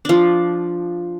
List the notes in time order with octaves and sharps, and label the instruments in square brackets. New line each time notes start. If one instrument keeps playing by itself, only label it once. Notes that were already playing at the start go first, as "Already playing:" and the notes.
[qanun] F3 D4